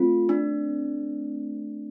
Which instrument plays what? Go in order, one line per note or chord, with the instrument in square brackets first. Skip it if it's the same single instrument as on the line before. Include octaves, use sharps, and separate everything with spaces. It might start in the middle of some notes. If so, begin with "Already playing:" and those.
Already playing: [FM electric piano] A3 C4 [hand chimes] F4
[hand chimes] D4